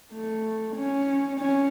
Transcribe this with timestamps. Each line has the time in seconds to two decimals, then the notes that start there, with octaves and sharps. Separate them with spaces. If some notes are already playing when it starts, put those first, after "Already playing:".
0.13 A3
0.76 C#4
1.40 C#4